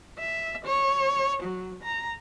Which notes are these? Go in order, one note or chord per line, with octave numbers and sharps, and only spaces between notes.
E5
C#5
F#3
A#5